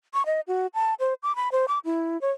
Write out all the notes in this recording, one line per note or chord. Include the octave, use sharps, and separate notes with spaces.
C#6
D#5
F#4
A5
C5
D6
B5
C5
D6
E4
C#5